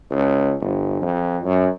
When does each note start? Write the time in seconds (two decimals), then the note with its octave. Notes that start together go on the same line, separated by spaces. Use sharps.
0.11 C#2
0.61 G1
1.02 F2
1.44 F#2